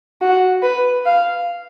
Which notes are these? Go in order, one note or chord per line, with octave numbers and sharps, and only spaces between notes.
F#4
B4
F5